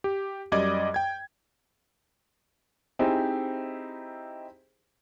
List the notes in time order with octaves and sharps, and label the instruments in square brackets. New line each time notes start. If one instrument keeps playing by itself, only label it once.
[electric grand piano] G4
F#2 G3 D5 D#5 D6 G#6
G5 G#6
[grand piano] C4 D#4 E4 G4 G#4 C5